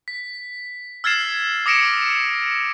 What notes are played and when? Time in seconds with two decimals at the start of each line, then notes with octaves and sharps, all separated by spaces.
0.08 B6
1.04 E6 F6 G#6 A6 C7 E7
1.66 D6 D#6 A#6 C#7 D7 E7